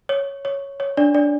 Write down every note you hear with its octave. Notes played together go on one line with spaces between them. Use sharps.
C#5
C#5
C#5
D4 D5
D4 D5